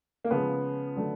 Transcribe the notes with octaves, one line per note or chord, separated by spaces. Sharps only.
A#3
C#3 F3 G#3 B3
D3 F#3 A3